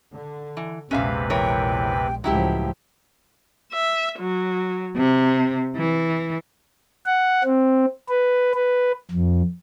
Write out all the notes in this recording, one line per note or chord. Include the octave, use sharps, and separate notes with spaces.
D3
E3
A#1 E2 C3 G#3 C#4 B4 E5 F5
E3 A#4 C#5 G5
C#2 A2 F3 F#3 E4 G4 G5
E5
F#3
C3
E3
F#5
C4
B4
B4
F2